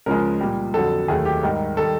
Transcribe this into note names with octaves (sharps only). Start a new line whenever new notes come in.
C#2 C#3 F3 G#3 A#4
A#2 G3
F2 D3 F#3 A4
D#2 D#3 F#3 A3 G#4
G4
G#2 D#3 G3
D#3 G3 A4